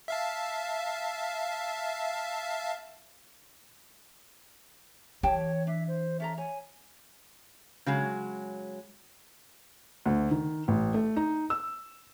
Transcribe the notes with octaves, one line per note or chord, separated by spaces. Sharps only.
E5 F5 A5
E3 G4 C#5 G5 A5
D4 E5
C5
C#4 A4 E5 A#5
C#5 G#5
C#3 F#3 G#3
D2
D#3
A1
A3
D#4
E6